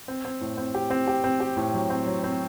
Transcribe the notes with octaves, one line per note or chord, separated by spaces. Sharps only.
C4
C4
A2
C4
G4
C4
G4
C4
G4
A2
F#3
C4
F#3
C4